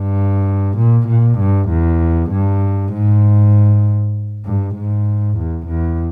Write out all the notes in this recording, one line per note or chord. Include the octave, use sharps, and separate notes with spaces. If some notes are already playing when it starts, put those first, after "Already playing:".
Already playing: G2
A#2
A#2
G2
E2
G2
G#2
G2
G#2
E2
E2